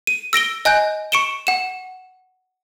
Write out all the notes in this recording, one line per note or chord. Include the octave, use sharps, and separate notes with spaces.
D#7
E6 A#6 D7 G7
D#5 G#5 F#6 G6
C#6 C#7 D7 E7 G7
F#5 E7